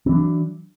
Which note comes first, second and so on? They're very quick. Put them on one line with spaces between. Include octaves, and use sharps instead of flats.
C4 E3 F#3 D4